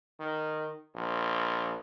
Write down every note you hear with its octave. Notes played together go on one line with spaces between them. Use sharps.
D#3
A#1